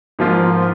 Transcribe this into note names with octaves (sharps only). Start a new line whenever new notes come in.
G#2 F3 A#3 F4